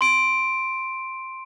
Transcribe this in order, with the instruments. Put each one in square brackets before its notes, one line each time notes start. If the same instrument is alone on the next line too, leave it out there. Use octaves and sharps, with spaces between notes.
[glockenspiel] C6 D7